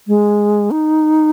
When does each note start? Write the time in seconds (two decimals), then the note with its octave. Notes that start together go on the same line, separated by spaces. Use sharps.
0.08 G#3
0.71 D#4